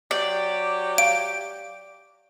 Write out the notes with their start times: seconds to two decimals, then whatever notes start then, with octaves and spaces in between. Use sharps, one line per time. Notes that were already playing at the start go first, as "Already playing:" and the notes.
0.11 F#3 G4 D5
0.98 F5 D6 D7